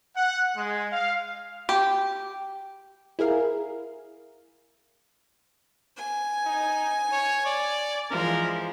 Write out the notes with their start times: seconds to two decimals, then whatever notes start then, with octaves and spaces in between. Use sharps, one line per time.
0.16 F#5
0.56 G#3
0.91 F5
1.69 G4
3.19 E4 G#4 A#4 F5
5.96 G#5
6.45 D#4
7.12 C#5
7.46 D5
8.11 E3 F3 G#3 A#4